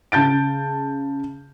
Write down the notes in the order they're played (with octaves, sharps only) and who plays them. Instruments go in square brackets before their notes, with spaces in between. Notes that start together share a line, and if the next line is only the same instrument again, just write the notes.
[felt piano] C#3 A5 G6 A6 D7